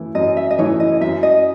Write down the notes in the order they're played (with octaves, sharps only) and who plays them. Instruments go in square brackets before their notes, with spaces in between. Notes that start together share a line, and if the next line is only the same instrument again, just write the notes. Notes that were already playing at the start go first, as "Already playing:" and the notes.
Already playing: [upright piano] F#2 E3 A3 E4
[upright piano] F#2 [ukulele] D#5
[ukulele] E5
D#5
[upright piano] E3 A3 E4 [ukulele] C#5
[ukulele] D#5
[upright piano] F#2 [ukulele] E5
[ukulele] D#5